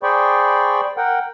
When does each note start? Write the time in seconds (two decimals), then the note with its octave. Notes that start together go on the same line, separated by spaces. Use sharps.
0.03 G#4 C5 D5 G5 B5 C#6
0.97 A#4 F#5 G5